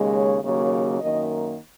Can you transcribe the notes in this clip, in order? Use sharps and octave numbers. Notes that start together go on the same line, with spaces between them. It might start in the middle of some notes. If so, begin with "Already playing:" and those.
Already playing: D#2 C#3 G#3
C#5
D#2 C#3 F#3 A#3 C#5
F#2 D#3 A#3 D#5